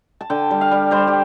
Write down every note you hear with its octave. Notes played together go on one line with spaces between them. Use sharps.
A5
D3 G5
G3
F5
G3
G3 C5
G4